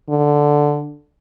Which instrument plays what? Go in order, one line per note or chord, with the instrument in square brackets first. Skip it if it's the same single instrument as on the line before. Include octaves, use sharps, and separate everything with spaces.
[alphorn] D3